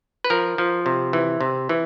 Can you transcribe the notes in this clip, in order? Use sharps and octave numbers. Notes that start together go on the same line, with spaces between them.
B4
F3 A#4
F3
C3
E3
C3
E3